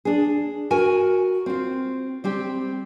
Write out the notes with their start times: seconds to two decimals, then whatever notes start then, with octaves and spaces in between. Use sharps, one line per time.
0.05 D4 G#4
0.71 F#4 A#4 G#5
1.46 C4 F4
2.24 G3 C4 G4